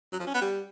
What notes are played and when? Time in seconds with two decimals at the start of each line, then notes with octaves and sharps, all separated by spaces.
0.12 F#3
0.20 F3
0.27 C#4
0.34 B3
0.42 G3